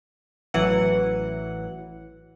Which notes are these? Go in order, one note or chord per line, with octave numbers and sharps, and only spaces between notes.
A1 E3 F#3 F#5